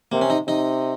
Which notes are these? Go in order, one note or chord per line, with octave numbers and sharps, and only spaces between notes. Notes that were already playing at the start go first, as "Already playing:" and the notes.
C3 A#3
C#4
D#4
C3 D#4